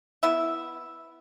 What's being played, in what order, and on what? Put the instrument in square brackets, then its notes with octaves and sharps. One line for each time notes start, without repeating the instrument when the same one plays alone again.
[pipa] B3 E4 E5